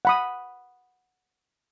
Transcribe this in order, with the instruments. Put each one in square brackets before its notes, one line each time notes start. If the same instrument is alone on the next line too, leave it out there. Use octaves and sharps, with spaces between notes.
[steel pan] F#5 B5 D#6